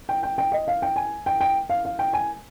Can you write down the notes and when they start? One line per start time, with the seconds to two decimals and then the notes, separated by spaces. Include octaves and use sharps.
0.09 G5
0.23 G5
0.38 G5
0.52 D#5
0.68 F5
0.82 G5
0.96 G#5
1.26 G5
1.41 G5
1.69 F5
1.85 F5
1.99 G5
2.13 G#5